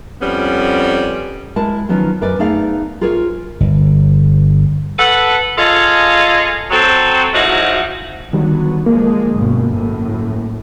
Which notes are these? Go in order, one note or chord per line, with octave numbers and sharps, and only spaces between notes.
F2 G3 B3 C#4
G#3 E4 A#4 A5
D#3 F3 F#3 B3 C#4
F#2 A#4 B4 D5
A3 B3 D#4 G#4 D5 F5
F4 G#4 A#4 C5 C#5
G1
A4 B4 F#5
F4 G#4 A4 C#5 D#5 F5
F#3 C4 A4
G#2 F3 F#3 D#4 E4 F#4
D3 D#3 F#3 G3 B3
D3 F3 G#3 A#3
G1 F#2 B2
F#2 A2